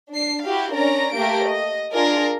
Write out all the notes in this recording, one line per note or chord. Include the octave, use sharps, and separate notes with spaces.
D4 C7
E4 F#4 G4 F5
C#4 D4 A#4 D5 A#5
A3 A#3 G4 A#4 D7
D#5
D4 F4 G#4 A#4 D5